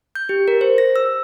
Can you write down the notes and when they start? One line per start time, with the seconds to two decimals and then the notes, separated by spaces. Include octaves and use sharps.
0.15 G6
0.29 G4
0.48 A#4
0.61 C5
0.78 A#6
0.96 E6